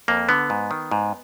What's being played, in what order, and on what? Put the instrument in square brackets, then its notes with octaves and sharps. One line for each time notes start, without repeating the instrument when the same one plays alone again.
[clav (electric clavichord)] F2 A#3
D3 B3
G#2
D#3
G#2